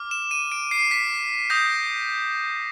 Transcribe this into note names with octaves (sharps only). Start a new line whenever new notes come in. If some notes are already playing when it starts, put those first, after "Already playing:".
Already playing: D6 F6
E7
D#7
D7
C7
B6
D#6 G6 A#6